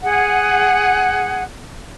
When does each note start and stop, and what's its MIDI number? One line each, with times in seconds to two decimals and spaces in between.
0.02 1.43 68
0.02 1.43 78